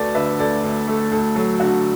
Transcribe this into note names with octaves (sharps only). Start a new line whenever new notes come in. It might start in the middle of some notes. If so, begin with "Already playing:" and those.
Already playing: D2 A3 F#4 A4 B4 D5
D3 B4 E5
D2 A4 D5
D2
A3 A4
D2 A4
F#3 A4
D3 F#4